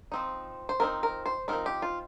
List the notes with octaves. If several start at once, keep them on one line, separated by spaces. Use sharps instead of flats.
F3 C4 D#4
C5
F3 C4 D#4 A#4
A#4
C5
F3 C4 D#4 A#4
G4
F4